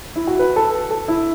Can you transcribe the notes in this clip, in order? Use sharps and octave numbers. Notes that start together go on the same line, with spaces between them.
E4
F#4
B4
A4
A4
E4